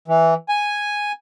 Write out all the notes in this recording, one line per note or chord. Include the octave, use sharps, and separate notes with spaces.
E3
G#5